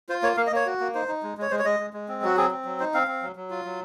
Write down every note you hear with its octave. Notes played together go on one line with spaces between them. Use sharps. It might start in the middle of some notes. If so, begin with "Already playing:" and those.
F4 C5
A#3 C#5
A#3 F5
D#5
A#3 C#5
F#4
A#3
D#4 C5
D#4
G#3
G#3
C#5
G#3 C5
C#5
G#3 D#5
G#3
G#3
C4
F#3 F#4
C4 G#4
C4
F#3
D#4 C5
C4 F5
C4
F#3
F#3
F4
F#3